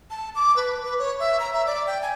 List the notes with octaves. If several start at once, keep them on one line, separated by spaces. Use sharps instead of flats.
A5
D6
B4
B4
C#5
E5
A#5
E5
D5
G5
G#5